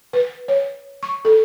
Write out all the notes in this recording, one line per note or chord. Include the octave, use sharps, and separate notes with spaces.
B4
C#5
C#6
A4